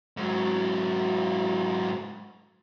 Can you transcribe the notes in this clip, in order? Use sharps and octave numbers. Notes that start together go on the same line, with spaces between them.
G#2 F#3